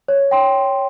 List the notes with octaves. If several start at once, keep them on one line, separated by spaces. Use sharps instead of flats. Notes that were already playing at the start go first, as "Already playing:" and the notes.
C#5
G5 C6